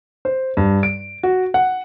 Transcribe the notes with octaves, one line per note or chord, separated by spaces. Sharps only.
C5
G2
D7
F#4
F#5